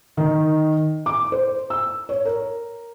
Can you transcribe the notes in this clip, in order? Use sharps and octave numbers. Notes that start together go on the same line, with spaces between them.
D#3
D6
C5
E6
C#5
A#4